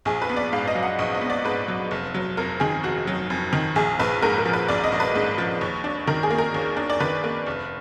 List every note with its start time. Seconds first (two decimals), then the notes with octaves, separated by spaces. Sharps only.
0.05 A#1 G#4
0.22 B4
0.29 B3
0.36 D5
0.53 G#2 F5
0.67 D#5
0.75 F#3
0.83 F#5
0.99 A#1 D#5
1.15 D#5
1.21 B3
1.30 D5
1.44 G#2 B4
1.68 F#3
1.91 F1
2.14 F#3
2.37 F2 A#4
2.60 D#3 G#4
2.83 F1 F#4
3.07 F#3
3.30 F2
3.53 D#3
3.76 A#1 G#4
3.99 A#1 B4
4.22 G#2 A#4
4.38 A#4
4.45 F3
4.53 B4
4.69 A#1 D5
4.84 D#5
4.92 A#1
5.00 B4
5.15 G#2
5.38 F3
5.61 D#2
5.84 D4
6.07 D#3 A#4
6.23 G#4
6.31 A#3
6.38 A#4
6.54 D#2
6.77 D4
6.90 D5
7.00 D#3 B4
7.24 A#3
7.46 F1